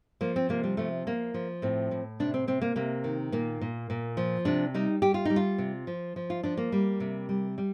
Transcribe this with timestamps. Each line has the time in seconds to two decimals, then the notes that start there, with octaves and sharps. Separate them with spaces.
0.21 F3 A#3
0.36 C4
0.49 C3 A#3
0.64 G3
0.77 F3 A3
1.06 F3 A#3
1.34 F3
1.62 A2 C4
1.91 A2
2.20 C3 D4
2.34 C4
2.48 C3 C4
2.62 A#3
2.76 C3 A#3
3.04 D#3
3.32 A#2 A#3
3.61 A#2
3.90 A#2
4.17 F3
4.45 C3 D4
4.74 G3 D#4
5.02 G3 G4
5.14 F4
5.25 G3 D#4
5.36 F4
5.58 C3
5.87 F3
6.16 F3
6.30 F4
6.43 F3 D4
6.57 A#3
6.72 G3
7.00 C3
7.29 G3
7.58 G3